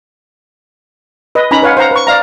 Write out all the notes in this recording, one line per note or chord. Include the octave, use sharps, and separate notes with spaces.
B4 D#5
C#4 D#4 A#5 B5
B4 C#5 F5 F#5
C5 F5 F#5 A#5
B4 C#6
D5 F5 A#5